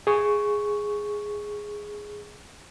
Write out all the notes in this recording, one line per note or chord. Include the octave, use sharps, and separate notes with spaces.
G#4 C#6